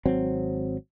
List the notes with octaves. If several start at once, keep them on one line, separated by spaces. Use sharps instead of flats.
G#1 F#3 C4